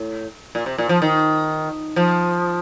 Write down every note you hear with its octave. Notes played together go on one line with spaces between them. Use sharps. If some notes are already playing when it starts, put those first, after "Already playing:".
Already playing: A2
A#2
C3
A#2
F3
D#3
F3